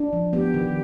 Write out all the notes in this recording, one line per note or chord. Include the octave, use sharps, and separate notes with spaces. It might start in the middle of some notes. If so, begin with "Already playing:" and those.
Already playing: D4
F3
B3 G4
D#3